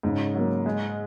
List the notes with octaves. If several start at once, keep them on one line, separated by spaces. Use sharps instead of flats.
G#2 C#3
F#3 A#3
G#3